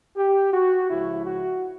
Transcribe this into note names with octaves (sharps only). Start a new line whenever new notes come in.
G4
F#4
C#2 C#3 F3 E4
F#4